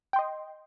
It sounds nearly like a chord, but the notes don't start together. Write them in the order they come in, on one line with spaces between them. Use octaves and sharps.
G5 C6 D#5